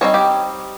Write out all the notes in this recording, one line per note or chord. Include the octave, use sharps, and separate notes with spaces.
G3 C4 D#4 C#5
G4